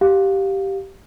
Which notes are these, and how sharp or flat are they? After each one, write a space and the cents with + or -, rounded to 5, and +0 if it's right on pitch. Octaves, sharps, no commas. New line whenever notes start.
G4 -10 F5 +15